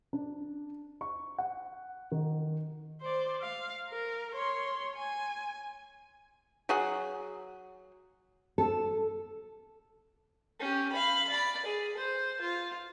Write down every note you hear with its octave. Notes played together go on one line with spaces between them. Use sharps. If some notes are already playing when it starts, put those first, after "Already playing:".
D4
C#6
F#5
D#3
C5 D5
F5
A#4
C#5 C6
G#5
F#3 G#4 F#5
A4
C#4 G4
F5 B5
D5 B5
G#4
C5
F4